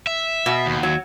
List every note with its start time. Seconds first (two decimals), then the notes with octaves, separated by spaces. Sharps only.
0.07 E5
0.46 B2
0.66 D#2
0.83 F#3